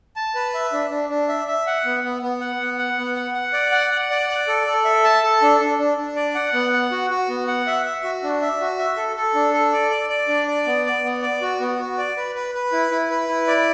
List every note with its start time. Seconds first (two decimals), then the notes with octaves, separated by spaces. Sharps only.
0.16 A5
0.35 B4
0.54 E5
0.73 D4
0.90 D4
1.10 D4
1.29 E5
1.48 E5
1.67 F#5
1.85 B3
2.04 B3
2.22 B3
2.40 F#5
2.60 B3
2.79 F#5
2.98 B3
3.16 F#5
3.34 F#5
3.53 D5
3.72 F#5
3.91 F#5
4.10 D5
4.29 D5
4.48 A4
4.67 A4
4.85 E5
5.04 A5
5.23 A4
5.42 D4
5.60 D4
5.78 D4
5.98 D4
6.16 D5
6.35 F#5
6.54 B3
6.73 F#5
6.91 F#4
7.10 F#4
7.29 B3
7.47 F#5
7.67 E5
7.85 E5
8.04 F#4
8.23 D4
8.42 E5
8.60 F#4
8.79 E5
8.97 A4
9.16 A4
9.34 D4
9.54 A4
9.73 D5
9.91 D5
10.09 D5
10.28 D4
10.48 D5
10.66 B3
10.86 D5
11.04 B3
11.22 D5
11.42 F#4
11.60 B3
11.79 F#4
11.98 D5
12.17 B4
12.35 B4
12.54 B4
12.72 E4
12.91 E4
13.10 B4
13.29 E4
13.47 D5